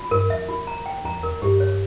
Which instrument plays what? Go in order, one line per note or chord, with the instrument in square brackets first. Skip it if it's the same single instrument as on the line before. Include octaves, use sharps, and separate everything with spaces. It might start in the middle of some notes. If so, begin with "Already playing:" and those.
Already playing: [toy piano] F4
[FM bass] G2 [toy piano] A#4
[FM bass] F2 [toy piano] E5
[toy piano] F4
A#5
G5
[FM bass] F2 [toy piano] A#5
[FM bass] E2
[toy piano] A#4
[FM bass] G2 [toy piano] G4
[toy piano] C#5